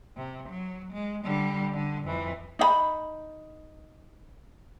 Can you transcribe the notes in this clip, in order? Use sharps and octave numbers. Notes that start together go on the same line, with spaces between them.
C3
F#3
G#3
D3 G3
D3
F2 E3
D#4 F5 B5